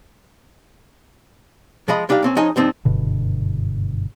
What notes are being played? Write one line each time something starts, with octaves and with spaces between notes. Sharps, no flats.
F3 G#3 D#5 B5
G3 D4 D#4 G4 F5
B1 C4 C#4
F3 C#4 D#4 G#4 C#5 D#5
G2 F3 C4 D#4
F#1 G2 B2 D3